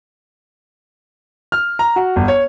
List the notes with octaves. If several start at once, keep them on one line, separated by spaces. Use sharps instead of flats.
F6
A#5
F#4
G1
C#5